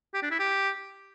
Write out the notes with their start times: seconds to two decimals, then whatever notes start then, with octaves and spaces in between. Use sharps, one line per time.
0.14 G4
0.23 D4
0.31 E4
0.40 G4